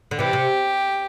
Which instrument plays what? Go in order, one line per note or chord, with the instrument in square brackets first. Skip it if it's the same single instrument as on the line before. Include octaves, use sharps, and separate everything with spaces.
[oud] D3
[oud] C3 E3 [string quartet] G4
[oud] C3